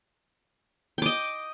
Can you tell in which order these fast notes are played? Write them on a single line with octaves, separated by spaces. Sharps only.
G5 D6 D#5